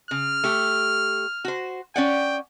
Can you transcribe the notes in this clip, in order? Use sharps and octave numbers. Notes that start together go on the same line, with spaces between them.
C#3 F6
A3 G4
F#4 C5
C#4 D5 F#5 G5